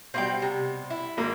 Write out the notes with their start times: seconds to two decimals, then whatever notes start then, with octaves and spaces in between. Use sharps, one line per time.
0.14 B2 G3 C4 F5 G5
0.42 C3
0.90 E4
1.17 G#1 A#3